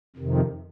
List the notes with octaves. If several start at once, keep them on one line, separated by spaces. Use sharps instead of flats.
F2 C3 D#3